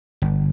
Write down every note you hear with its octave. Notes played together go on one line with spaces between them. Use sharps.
G1